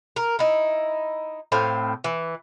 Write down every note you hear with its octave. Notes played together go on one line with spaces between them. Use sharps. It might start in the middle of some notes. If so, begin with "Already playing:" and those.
A#4
D#4 E4
A2 C4 F5
E3